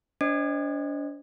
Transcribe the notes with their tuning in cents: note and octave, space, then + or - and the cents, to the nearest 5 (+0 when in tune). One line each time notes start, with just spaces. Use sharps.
D4 -40 C5 +0 D#5 +0